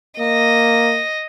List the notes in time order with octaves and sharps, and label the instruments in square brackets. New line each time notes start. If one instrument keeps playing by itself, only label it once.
[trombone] A#3 [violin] D#5